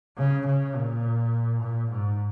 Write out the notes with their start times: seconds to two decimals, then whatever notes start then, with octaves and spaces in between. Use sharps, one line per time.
0.17 C#3
0.46 C#3
0.75 A#2
1.62 A#2
1.92 G#2